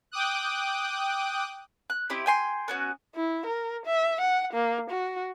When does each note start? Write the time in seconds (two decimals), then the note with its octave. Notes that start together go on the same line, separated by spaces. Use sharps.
0.12 G5 D6 D#6 F#6
1.90 F#6
2.10 C4 E4 G4 D#5
2.26 G5 G#5 C6
2.68 B3 C#4 F#4
3.16 E4
3.46 A#4
3.86 E5
4.21 F#5
4.53 A#3
4.90 F#4